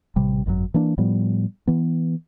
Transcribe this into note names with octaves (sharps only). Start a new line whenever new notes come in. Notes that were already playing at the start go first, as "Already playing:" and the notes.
A1 C3 G3
G#1 F#2 D#3 F#3
E3 A#3 D4
A2 F3 G3 B3
E3 B3